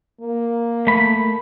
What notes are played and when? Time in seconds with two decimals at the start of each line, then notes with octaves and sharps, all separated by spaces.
0.21 A#3
0.87 A3 B5